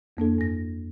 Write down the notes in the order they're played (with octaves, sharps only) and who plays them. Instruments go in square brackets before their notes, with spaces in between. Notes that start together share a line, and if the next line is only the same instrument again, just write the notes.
[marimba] F2 A#3 D4 A4
G2 A#6